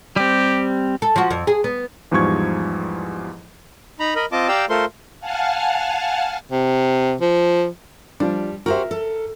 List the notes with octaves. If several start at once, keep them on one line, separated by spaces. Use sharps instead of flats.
G3 C4 G4
A4
F3 F#4
F2
G#4
B3
E2 G#2 F3 G3 C#6 G#6
D#4 A#5 B5
A#4 D#5 B5
C4 F4 D#5 A5 D6
G4 D5 F5 G5 A#5 E6
A3 F4 A4 A#4 C5 C6
F5 F#5 G#5 A5 F6
C3
F3
F3 G3 D4
F#4 G4 A#4 C5 E5
A4